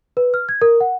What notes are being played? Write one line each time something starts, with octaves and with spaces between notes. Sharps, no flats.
B4
F6
G#6
A#4
F#5